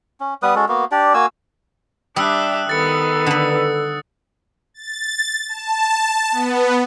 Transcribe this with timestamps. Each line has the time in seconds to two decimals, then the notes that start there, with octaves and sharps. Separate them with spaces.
0.20 C#4
0.42 G3 B3 B4 D#6
0.55 G#3 C#4 F#4 A4
0.68 A#3 B3 F#4
0.92 D4 G4 D5
1.14 A#3 F#4 G#5 E6
2.16 G3 D4 G4 E5 D#6 E6 F#6
2.69 D#3 B3 A4 A6 C#7
3.27 D3 B4 D#6
4.74 A6
5.49 A5
6.32 B3